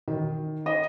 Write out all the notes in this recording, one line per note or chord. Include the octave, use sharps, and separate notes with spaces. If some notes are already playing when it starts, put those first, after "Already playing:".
D#3
D#5